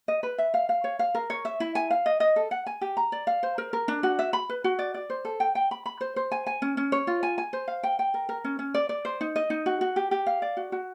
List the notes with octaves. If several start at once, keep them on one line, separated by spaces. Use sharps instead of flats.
D#5
B4
E5
F5
F5
C#5
F5
A#4
C#5
E5
E4
G#5
F5
D#5
D#5
A4
F#5
G#5
G4
A#5
D5
F5
C5
A#4
A#4
D4
F#4
E5
B5
B4
F#4
D5
D5
C5
A4
G5
G5
B5
B5
C5
C5
G#5
G#5
C#4
C#4
C#5
F4
G#5
G#5
C5
F5
G5
G5
A#4
A#4
C#4
C#4
D5
D5
C5
D#4
D#5
D#4
F#4
F#4
G4
G4
F5
D5
F#4
F#4